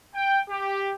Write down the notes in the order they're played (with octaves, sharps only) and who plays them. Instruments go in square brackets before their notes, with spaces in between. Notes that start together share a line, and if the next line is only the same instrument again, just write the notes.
[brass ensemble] G5
G4